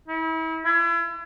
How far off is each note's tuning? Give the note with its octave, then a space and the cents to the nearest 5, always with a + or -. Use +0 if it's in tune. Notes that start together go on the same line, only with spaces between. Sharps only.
E4 -35
E4 +40